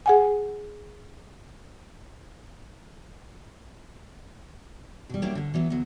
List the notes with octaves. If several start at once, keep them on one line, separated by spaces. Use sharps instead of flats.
G#4 F#5 G#5
B2 G3
F#3 G3 A#3 D4 E4 G4
D2 D3
E3 F#3 B3
D2 F#3